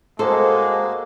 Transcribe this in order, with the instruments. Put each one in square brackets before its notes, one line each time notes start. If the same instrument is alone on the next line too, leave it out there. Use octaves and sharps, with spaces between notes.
[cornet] G#3 [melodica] A#3 F#4 [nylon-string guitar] A4 [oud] C5